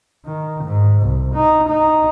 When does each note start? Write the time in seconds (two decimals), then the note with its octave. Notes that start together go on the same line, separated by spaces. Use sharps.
0.26 D#3
0.64 G#2
1.02 C2
1.35 D#4
1.69 D#4